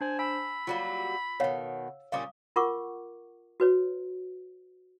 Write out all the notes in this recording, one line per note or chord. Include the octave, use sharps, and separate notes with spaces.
D4 C5 G#5 A5
G#5 B5 E6
F#3 G3 A#3 F4
B2 D#3 C#5 F5 F#5
A#2 G3 C#4 F5 D6 D#6
F4 A#4 F#5 C#6 D6
F#4 B4 C#5